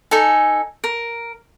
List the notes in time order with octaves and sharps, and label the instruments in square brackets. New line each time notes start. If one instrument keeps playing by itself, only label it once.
[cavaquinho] D#4 A4 G#5
A#4